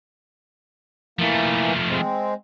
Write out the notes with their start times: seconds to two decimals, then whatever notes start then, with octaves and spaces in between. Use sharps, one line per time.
1.19 E3 F3 A3 A#3
1.90 G#3 C4